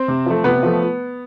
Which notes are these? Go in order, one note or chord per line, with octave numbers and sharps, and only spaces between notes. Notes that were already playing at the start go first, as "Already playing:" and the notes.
Already playing: C4 C5
C3
F3 A3
C3 B3 B4
F3 A3